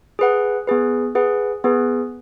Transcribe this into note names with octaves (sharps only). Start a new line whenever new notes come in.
G#4 B4 F#5
B3 G#4 B4
G#4 B4 F#5
B3 G#4 B4